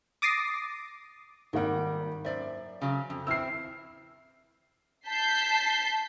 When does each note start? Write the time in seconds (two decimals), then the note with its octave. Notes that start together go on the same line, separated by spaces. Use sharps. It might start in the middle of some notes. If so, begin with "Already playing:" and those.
0.22 D6 D#6 A6 A#6 C7
1.53 G#1 D#3 G3 A#3 F#5
2.24 F#2 C5 D5 E5
2.81 C#3 F#3
3.10 F2
3.27 C4 E4 E6 F6 C7
5.08 A5 G6 B6 C7